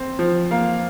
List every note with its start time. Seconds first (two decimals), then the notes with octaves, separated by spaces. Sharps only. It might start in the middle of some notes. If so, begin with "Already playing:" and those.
Already playing: C4
0.19 F3
0.51 A#3 F5